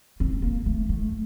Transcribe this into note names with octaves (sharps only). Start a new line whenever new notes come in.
C4
A#3
A3
A3